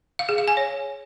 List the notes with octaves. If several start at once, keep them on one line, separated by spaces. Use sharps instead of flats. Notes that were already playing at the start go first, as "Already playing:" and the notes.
F5
G#4
F5
G#5
C#5